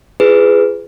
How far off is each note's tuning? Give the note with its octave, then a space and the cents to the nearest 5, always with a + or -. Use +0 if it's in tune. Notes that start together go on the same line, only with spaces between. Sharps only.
F4 -20 G#4 +0 B4 +20